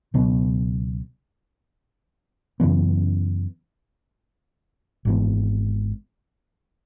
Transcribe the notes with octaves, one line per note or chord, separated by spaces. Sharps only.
C#2 B2 F#3 B3
F#2 C#3 E3 B3
G#1 G#2 E3 B3